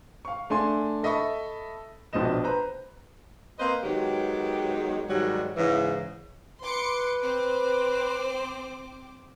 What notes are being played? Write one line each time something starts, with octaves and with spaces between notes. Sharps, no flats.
F5 C#6
A3 D4 G#5 C6
A4 D#5 E5 A5 B5 C#6
A#1 B2 D4 C5 D#5 E7
B4 C5 A#5
A#3 C4 B4 C5 D#5
D#3 F#3 G#3 B3 G4
G#2 D#3 F#3 G3
G#2 C#3 E3
B4 C6 D6 C#7
C4 C5 D6